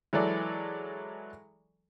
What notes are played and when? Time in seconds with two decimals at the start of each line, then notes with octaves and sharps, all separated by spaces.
0.13 E3 F#3 G#3 A4 D5